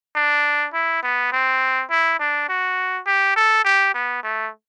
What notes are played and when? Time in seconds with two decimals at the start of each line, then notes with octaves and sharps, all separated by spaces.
0.16 D4
0.74 E4
1.03 B3
1.32 C4
1.90 E4
2.19 D4
2.49 F#4
3.06 G4
3.36 A4
3.64 G4
3.94 B3
4.23 A3